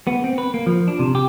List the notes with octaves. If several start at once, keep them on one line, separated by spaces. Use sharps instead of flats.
B3
C4
B4
A#3
F3
D4
C3
G4